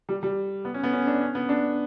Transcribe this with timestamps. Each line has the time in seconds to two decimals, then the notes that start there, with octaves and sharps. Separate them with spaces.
0.09 G3
0.23 G3
0.65 B3
0.74 C#4
0.83 B3
0.93 C#4
1.07 D4
1.21 C#4
1.35 B3
1.49 D4